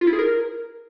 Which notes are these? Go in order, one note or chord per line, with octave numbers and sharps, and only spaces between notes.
F4
E4
G#4
A#4